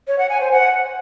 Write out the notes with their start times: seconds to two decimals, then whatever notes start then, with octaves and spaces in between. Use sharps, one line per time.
0.07 C#5
0.19 F#5
0.30 G#5
0.41 C5
0.52 F#5